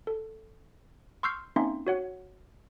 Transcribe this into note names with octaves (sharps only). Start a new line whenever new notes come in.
A4
C6 C#6 E6 F6 G6 C7
A#3 C4 C#4 D#4 E5 C6
F#4 C#5 F#5